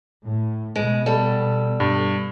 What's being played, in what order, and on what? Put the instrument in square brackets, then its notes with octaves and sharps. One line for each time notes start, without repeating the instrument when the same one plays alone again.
[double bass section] A2
[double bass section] B2 [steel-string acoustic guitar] G#3
[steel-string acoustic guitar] G3 A4
[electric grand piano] G2